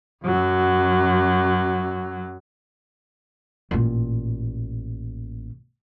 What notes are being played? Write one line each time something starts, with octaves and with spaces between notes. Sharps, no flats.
F#2 F#3
A1 A#2